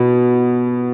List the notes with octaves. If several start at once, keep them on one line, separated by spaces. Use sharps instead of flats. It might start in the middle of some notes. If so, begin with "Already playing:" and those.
Already playing: B2